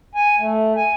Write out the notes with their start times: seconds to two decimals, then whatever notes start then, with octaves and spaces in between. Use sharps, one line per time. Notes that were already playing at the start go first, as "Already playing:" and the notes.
0.15 G#5
0.38 A3
0.76 G#5